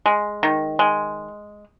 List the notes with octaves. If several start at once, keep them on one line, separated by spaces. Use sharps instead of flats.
G#3
D#3
G#3